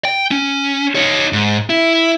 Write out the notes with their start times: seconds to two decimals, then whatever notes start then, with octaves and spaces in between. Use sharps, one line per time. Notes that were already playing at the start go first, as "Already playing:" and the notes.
0.05 G5
0.31 C#4
0.95 D#4 C#5
1.33 G#2
1.70 E4